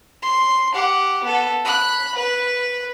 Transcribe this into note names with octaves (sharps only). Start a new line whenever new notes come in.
C6
G4 F#5
B3 A4
B5 F#6
B4